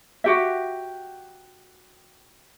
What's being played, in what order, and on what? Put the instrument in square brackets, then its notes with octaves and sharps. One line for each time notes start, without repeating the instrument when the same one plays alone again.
[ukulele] F#4 G4 E5